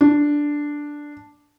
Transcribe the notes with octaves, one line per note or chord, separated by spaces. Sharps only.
D4